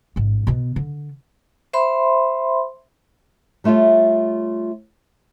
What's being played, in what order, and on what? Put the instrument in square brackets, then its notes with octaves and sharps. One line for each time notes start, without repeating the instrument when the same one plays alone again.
[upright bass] A1 G#2
B2 B3
D3
[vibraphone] C5 E5 B5 C6
[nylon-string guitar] G3 A3 F4 C#5 E5